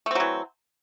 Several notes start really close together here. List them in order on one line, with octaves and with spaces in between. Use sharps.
A3 C4 F#3 E3